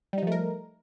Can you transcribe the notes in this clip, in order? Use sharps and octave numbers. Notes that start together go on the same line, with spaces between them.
F3 G3 A3 D#4 A#4